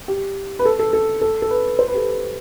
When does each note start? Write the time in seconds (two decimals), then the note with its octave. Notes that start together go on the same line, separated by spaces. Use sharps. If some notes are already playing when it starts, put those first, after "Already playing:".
0.08 G4
0.59 B4
0.65 A4
0.79 A4
0.93 A4
1.21 A4
1.42 A4
1.50 B4
1.79 C5
1.88 B4
1.94 G4
1.97 A4